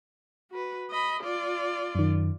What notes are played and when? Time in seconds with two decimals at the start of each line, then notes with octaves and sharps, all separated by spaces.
0.51 F#4 B4
0.91 D#5 B5
1.23 F4 D5
1.95 F#2 D#3